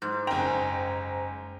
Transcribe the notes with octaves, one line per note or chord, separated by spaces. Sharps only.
G#2
F#1 G5 G#5 A#5